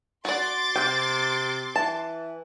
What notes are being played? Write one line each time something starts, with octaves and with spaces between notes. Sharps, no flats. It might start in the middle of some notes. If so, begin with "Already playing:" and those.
F#4 D5 C6 D6 A6
C3 G5
E3 A5